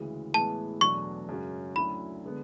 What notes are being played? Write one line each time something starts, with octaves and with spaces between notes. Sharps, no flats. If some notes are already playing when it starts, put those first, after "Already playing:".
Already playing: D2 C#3 E3 G#3
A2 E3 G#3 B3 A5
E2 B2 F#3 A3 D4 C#6
F#2 C#3 G#3 C#4 F#4
D2 D3 F#3 C#4 E4 B5
D3 G#3 B3